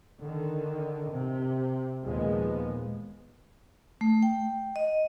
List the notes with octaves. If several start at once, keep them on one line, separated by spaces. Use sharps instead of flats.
D3 D#3
C3
D#2 A#2 F3 G#3 B3
A3
G5
D#5